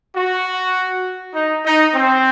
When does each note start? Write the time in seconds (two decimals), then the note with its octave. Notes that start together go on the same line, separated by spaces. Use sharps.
0.15 F#4
1.34 D#4
1.64 D#4
1.94 C4